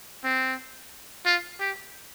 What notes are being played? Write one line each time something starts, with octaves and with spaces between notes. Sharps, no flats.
C4
F4
G4